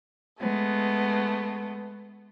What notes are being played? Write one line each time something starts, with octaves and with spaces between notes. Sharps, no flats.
G#3 A3 B3